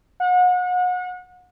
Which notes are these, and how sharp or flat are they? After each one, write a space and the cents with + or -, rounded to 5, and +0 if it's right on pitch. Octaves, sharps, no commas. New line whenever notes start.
F#5 -35